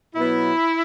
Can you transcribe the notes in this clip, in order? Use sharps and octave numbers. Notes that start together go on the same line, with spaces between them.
B2 F#3 B3 E4